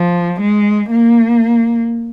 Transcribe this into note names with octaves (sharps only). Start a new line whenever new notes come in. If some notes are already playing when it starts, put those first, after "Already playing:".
Already playing: F3
G#3
A#3